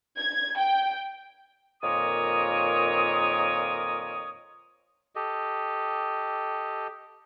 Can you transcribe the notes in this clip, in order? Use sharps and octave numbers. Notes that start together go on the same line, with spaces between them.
G#6
G5
F2 A#2 D#3 A#4 C#5 D#6
G4 A4 D#5